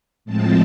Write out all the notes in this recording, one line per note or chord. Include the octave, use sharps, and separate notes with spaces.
A2 F3 G#3 C4 A5